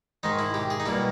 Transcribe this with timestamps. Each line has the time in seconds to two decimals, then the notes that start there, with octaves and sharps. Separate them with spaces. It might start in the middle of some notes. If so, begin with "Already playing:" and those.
0.23 G#2 D#3 G#3 D#4
0.39 E4
0.54 G4
0.70 G#4
0.80 D#4
0.86 B2 G3 A#3 E4